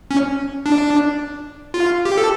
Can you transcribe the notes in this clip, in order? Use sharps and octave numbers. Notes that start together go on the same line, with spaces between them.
C#4
D4
F4
G4
A4